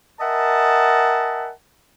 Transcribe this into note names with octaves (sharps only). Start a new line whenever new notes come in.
A#4 D#5 E5 F#5 G#5 A5